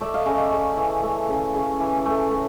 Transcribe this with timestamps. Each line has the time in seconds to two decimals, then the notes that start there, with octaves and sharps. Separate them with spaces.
0.01 A3 D5 E5
0.14 D#5 F5
0.26 C#3 D#5 F5
0.39 D5 E5
0.52 C#3
0.77 E3
1.03 A3
1.29 C#3
1.54 C#3
1.80 E3
2.05 A3
2.30 A2